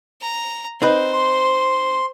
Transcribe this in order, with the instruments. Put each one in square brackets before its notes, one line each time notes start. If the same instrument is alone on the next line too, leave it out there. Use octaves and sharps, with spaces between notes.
[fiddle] A#5
[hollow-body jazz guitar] C4 D#4 B4 [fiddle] C5
[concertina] C6